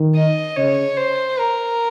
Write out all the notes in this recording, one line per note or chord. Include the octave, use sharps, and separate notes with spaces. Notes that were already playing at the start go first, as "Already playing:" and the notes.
Already playing: D#3
D#5
C#3 C#5
C5
A#4